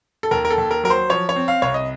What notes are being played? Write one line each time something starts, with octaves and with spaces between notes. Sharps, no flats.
A4
D#2 A#4
A#4
A4
D#2
A#4
F#3 A#4
C5
F3 C#5
C#5
C4
F5
C2 C#5
D#5